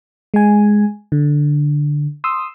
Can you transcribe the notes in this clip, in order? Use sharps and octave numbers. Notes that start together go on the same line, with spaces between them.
G#3 G#5
D3
C6 D#6 E6